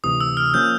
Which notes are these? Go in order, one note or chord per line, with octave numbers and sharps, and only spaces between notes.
D2 C3 E3 D#6
E6
F6
F3 A#3 C#4 G6